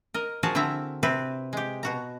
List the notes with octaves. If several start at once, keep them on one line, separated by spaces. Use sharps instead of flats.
A#4 D#5
F3 F#4 G#4 A#4 A5
D3 C4 E4 E5 A#5
C3 C4 B4
G#3 G4
B2 F#4 A#5